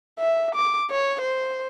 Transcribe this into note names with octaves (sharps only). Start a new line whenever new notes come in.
E5
D6
C#5
C5